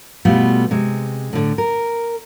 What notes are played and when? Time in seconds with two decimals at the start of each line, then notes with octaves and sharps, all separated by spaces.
0.25 B2 G3 A3 B3 F4
0.71 C3 G#3
1.33 A2 D3
1.58 A#4